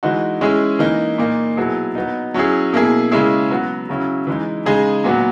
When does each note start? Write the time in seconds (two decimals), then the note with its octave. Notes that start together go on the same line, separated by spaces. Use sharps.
0.03 E3 G#3 D#4 F#4
0.41 G#3 C#4 E4 G#4
0.79 E3 A#3 D#4
1.18 A#2 A#3 D#4
1.56 B2 F#3 B3 E4 G#4
1.95 F#3 B3 D#4
2.34 F#3 C#4 E4 G#4
2.73 B2 A#3 E4 G#4
3.11 C#3 G#3 C#4 E4 G#4
3.51 F#3 B3 F#4
3.89 C#3 F#3 C#4 E4
4.27 E3 G#3 D#4
4.66 C#3 G#3 D#4 G#4
5.04 A#2 F#3 B3 F#4